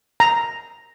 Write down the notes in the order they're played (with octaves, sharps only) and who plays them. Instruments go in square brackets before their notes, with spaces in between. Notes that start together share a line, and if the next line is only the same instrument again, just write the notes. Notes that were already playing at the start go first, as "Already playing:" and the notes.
[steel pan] A#5